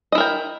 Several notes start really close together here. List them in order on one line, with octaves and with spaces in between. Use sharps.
D#5 E4 A#4 G5